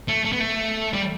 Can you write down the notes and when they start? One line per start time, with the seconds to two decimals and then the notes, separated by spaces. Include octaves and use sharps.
0.08 A3
0.25 A3
0.32 B3
0.40 A3
0.93 G3